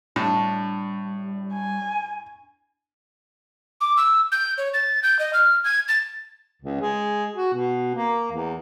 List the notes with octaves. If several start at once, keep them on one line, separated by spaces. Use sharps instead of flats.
A2 G3 D4
G#5
D6
E6
G6
C#5
A6
G6
D#5
F6
G#6
A6
C#2
G#3
F#4
B2
A#3
E2